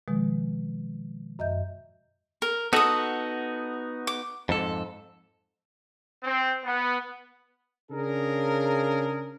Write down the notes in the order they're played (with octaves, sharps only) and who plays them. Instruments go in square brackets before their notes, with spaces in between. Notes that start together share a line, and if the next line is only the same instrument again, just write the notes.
[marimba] B2 D#3 F3 G#3
F#2 D#5 E5 G6
[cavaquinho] A#4
[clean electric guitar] B3 D#4 F#4 [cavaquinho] A4 D#6
[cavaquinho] D6
[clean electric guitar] F2 G#2 A4
[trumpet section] C4
B3
[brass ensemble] C#3 D4 G#4 A#4